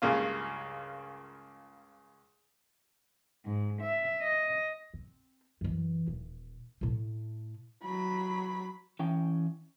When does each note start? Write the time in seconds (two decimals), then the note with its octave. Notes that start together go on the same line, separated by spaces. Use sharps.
0.02 C#2 G2 C#3 A#3 F4
3.45 G#2
3.81 E5
4.22 D#5
4.94 C4
5.61 F#2 E3
6.08 D#1
6.81 A2 A3
7.84 F#3 B5
8.99 E3 C#4 G5